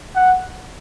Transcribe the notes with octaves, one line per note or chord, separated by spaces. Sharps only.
F#5